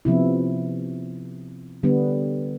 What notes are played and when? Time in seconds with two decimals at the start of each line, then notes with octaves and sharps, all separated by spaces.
0.05 C3 F3 B3 E4
1.83 D3 G3 B3